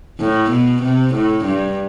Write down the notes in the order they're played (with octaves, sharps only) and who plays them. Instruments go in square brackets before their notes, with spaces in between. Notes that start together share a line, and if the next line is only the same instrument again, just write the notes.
[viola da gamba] A2
B2
C3
A2
G2